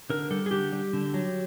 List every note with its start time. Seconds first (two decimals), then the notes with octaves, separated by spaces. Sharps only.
0.10 D3 A#4
0.31 G3 A4
0.46 G#4
0.51 D3 G4
0.72 G3
0.93 D3
1.14 F#3